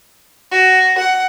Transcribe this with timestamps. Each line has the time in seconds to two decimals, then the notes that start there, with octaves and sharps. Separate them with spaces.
0.52 F#4
0.98 F#5